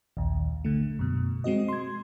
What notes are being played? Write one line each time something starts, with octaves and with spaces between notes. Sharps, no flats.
A#1 D#2
D3 A3
F#2 B2
G#3 C4 F#4 D#5
C6 G#6